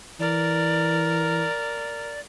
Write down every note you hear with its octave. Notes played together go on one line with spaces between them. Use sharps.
E3 A#4 D5